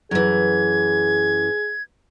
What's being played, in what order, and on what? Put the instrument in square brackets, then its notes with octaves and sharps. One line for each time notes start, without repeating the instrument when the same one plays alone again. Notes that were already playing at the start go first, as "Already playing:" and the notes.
[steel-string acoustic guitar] F#2 E3 [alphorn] G#4 [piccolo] G#6